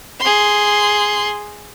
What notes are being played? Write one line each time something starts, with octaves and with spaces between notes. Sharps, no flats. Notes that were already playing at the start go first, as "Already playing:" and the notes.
G#4 C6